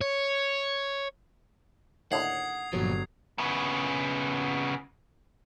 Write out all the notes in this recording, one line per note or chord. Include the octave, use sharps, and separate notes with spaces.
C#5
D#2 A2 D3 F#5 D#6 G#6 C7
G1 A#2 F3 F#3
C#3 B3